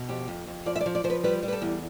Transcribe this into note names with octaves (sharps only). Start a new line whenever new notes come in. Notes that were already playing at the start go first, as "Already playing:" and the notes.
Already playing: B2
F2 G4
F2
F2
F3 D5
E5
D5
F3
D5
F3 C5
B4
G3 B4
G3
B4
A4
E2